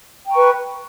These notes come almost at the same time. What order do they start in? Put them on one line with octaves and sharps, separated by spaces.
G5 A#5 C#6 B4